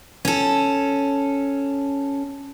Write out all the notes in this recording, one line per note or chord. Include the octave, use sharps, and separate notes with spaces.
C#4 A4